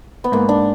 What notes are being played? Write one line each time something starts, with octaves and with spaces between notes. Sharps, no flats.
B3
G#2 A#3
D4